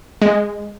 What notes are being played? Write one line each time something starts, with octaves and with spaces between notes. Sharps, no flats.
G#3